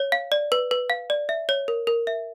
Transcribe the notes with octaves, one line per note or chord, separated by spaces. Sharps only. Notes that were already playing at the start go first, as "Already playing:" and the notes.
Already playing: C#5
F5
D5
B4
B4
F5
D5
E5
C#5
A#4
A#4
E5